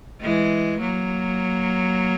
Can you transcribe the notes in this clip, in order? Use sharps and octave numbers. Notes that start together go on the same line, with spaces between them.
E3 G#3
F#3 A#3